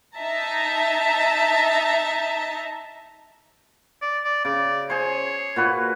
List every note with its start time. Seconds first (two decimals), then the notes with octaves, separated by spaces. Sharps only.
0.17 D#4 E5 A5 A#5
4.02 D5
4.25 D5
4.45 C#3 D5
4.90 G#4 C5 C#5
5.56 A#2 F#4 B4